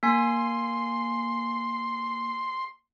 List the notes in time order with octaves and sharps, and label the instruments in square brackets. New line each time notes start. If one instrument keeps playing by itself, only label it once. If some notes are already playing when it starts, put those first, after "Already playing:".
[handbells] A#3 G#5 [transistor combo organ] C6